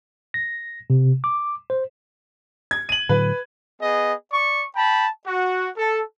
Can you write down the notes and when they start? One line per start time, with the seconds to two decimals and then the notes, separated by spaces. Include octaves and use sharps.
0.34 A#6
0.90 C3
1.24 D6
1.70 C5
2.71 G#6
2.89 D#7 F#7
3.09 A2 D3 F#3 B4
3.82 B3 G#4 D#5
4.32 D5 C#6
4.74 G5 A5 B5
5.26 F#4
5.77 A4